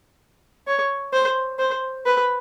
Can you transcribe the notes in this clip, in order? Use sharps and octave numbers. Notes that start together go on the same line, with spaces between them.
C#5
C5
C5
B4